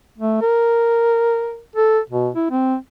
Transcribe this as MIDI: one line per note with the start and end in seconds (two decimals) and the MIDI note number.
0.18 0.40 57
0.41 1.60 70
1.76 1.99 69
2.10 2.29 47
2.34 2.48 64
2.51 2.75 60